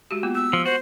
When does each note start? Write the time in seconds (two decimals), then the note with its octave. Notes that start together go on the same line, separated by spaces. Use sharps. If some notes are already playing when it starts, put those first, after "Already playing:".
0.11 G#3 F#4 G4
0.23 A#3 B3 F4
0.35 B3 E6
0.53 F3
0.66 F#4 C5